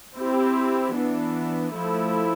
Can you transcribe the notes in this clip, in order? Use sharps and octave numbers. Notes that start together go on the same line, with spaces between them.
C4 E4 G4
E3 B3 D4
F3 A3 E4